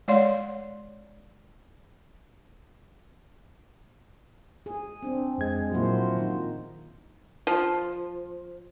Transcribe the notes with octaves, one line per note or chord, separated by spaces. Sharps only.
G#3 C#5 D5 F5 C6
G#4
C4 D4
F2 G#3 G#6
A#2 F3 F#3 A#3 E4 F#4 C5
D#3 D#4 F4
F3